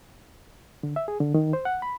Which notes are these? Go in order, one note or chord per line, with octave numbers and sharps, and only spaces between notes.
D3
E5
G#4
D3
D#3
C5
F#5
B5